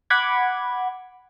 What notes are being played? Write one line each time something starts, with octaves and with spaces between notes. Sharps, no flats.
F#5 B5 D6 G#6